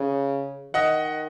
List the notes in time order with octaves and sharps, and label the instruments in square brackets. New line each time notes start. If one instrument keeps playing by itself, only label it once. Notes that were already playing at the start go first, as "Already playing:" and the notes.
Already playing: [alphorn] C#3
[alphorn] D#3 [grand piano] D#5 F#5